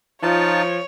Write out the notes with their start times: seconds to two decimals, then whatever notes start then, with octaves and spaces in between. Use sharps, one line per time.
0.23 F3 D#4 F4 C#5 A5